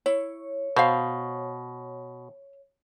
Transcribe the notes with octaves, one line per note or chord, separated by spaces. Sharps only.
E4 C#5
B2 C5 F5